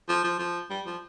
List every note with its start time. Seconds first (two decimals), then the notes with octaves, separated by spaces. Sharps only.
0.09 F3
0.24 F3
0.39 F3
0.70 G3
0.86 F3